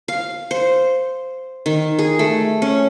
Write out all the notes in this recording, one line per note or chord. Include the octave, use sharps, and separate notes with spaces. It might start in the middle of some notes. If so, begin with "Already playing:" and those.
F5
C5
D#3
G#4
A3
C#4